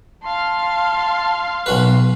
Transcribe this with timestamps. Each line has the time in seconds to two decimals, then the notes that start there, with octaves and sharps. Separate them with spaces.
0.24 F5 A5 C6
1.66 B1 F#4 B4